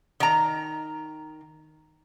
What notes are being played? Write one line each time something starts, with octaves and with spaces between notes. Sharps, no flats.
D#3 A#5